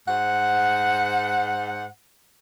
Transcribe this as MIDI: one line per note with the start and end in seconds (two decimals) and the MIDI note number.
0.08 1.86 44
0.08 1.86 72
0.08 1.86 78